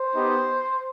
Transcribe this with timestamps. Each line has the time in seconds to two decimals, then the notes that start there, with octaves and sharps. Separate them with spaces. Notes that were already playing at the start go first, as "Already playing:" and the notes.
Already playing: C5
0.15 B3 D#4 G4